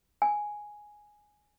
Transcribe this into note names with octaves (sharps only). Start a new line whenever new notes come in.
G#5